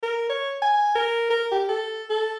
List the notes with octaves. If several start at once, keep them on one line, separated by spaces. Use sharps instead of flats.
A#4
C#5
G#5
A#4
A#4
G4
A4
A4